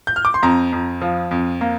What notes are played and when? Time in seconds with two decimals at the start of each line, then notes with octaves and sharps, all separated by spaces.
0.07 G6
0.16 F6
0.25 D6
0.34 C6
0.43 F2 A#5
0.73 F2
1.02 F3
1.31 F2
1.61 A#3